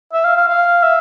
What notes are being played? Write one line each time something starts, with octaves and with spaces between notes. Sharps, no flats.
E5
F5
F5
F5
E5